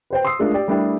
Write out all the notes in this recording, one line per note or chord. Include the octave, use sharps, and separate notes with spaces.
B4 C5 G5
C6 D#6 E6 C7
G#3 A3 D4 F4 A#4
G4 D5
G3 A3 D4 E4 G4 A#4